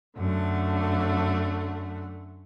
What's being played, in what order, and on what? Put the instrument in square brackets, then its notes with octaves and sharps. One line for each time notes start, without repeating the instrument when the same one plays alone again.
[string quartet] F#2 D3 A3 F#5